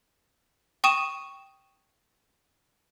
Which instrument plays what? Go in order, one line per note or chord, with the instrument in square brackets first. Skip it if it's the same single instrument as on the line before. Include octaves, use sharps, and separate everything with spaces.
[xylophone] G5 C#6 D#6 D#7 E7